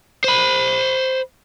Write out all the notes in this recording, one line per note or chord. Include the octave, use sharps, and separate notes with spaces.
C5 B5